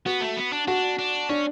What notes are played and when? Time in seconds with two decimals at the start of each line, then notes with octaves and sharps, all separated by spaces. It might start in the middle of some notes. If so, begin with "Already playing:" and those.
0.06 B3 F#4
0.21 A3
0.37 B3
0.53 D4
0.68 D4 F#4
0.98 D4
1.29 C#4 D4